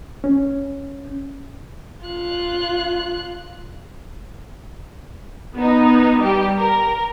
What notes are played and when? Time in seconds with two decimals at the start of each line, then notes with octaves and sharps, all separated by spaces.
0.24 C#4
2.05 F4 F#6
5.56 B3 D#4
6.20 G3 G4
6.58 A#4